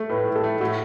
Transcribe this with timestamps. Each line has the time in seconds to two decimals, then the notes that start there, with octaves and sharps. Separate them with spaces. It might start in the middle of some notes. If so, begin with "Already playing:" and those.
Already playing: A3 A4
0.09 A2 B4
0.27 A2
0.36 A4
0.44 A3
0.60 A2 F#4